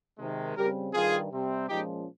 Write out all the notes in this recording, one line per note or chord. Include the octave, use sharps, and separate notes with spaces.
C3 D#3 G#3
C#3 G3 C4 G4 A#4
G2 D#3 G3 F4 G#4
C3 G3 C4
A#2 F3 G#3 C#4 D#4 G4